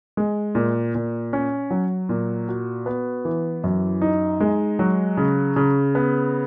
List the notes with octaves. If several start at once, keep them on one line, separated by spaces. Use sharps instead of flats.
G#3
A#2
A#2
C#4
F#3
A#2
F#4
B3
E3
F#2
D#4
G#3
F#3
C#3
C#3
B3